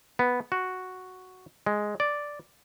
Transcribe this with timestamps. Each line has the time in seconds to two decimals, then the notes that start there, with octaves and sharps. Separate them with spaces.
0.19 B3
0.52 F#4
1.66 G#3
2.00 D5